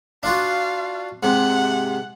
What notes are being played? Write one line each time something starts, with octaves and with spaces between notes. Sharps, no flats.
D4 F4 F#4 F5
G#2 C3 F#5